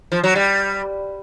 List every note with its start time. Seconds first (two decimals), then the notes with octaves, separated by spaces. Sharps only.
0.12 F3
0.24 F#3
0.35 G3